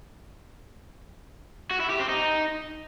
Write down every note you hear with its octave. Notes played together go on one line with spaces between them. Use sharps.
F#4
E4
G4
C4
D#4